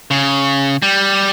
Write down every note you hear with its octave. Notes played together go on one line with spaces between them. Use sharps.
C#3
G3